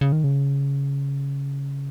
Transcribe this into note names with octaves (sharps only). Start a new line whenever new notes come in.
C#3
D#3
C#3